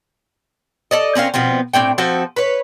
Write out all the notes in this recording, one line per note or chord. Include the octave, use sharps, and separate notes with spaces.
A4 D5 D#5
C4 C#4 A#4 F5
B2 F3 B3 C4
A2 C4 D4 G5
F3 C4 F#4 A4
B4 C#5